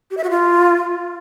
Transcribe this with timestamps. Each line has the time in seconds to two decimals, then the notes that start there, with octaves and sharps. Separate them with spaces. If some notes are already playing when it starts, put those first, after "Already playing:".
0.11 G4
0.17 E5
0.24 F#4
0.30 F4